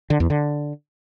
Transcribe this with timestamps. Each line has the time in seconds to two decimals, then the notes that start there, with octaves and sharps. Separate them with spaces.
0.10 D3
0.20 E2
0.30 D3